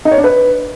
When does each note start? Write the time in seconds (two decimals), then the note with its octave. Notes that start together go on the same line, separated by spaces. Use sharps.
0.05 D#4
0.11 C#5
0.18 D4
0.24 B4